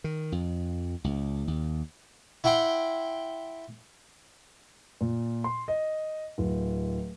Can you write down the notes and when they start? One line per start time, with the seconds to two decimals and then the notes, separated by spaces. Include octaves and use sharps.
0.04 D#3
0.32 F2
1.04 C#2
1.48 D#2
2.44 E4 F#5 G5 C6
5.01 A#2
5.44 C6
5.68 D#5
6.38 D1